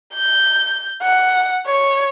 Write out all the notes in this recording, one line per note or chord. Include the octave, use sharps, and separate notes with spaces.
G6
F#5
C#5